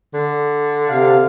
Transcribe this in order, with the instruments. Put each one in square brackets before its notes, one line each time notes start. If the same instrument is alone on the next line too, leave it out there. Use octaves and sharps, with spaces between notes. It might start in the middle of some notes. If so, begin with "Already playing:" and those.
[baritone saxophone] D3
[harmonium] C3 F5